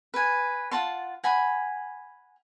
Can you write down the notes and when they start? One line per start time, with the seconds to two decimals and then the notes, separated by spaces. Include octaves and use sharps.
0.14 B4 G#5
0.71 F4 F#5 A5 C6
1.24 F#5 G#5 B5